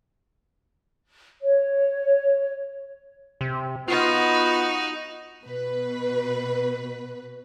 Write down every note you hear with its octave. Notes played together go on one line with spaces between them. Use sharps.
C#5
C3
B3 D#4 F4 F#4
B2 B4